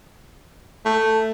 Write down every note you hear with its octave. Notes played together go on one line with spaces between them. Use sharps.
A3